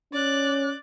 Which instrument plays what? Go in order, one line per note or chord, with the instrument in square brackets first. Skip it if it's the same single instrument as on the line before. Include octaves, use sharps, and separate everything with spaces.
[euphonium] C#4 [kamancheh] D5 F#6